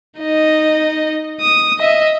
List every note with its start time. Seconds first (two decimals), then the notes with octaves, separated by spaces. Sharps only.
0.19 D#4 D#5
1.41 D#6
1.79 D#5 E5